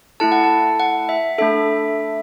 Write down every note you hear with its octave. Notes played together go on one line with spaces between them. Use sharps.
A3 E4 A4 A5
F#5
A5
F#5
E5
A3 D4 A4 E5